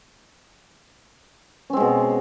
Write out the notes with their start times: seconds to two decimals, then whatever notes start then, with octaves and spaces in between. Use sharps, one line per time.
1.70 C#4
1.73 C4
1.77 G#3
1.80 B2